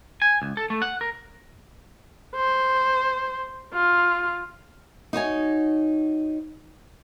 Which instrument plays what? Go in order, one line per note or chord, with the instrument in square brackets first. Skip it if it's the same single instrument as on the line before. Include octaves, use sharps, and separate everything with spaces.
[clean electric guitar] G#5
C#2
A4
A3
F#5
A#4
[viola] C5
F4
[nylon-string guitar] D#4 F#4 C#5 G#5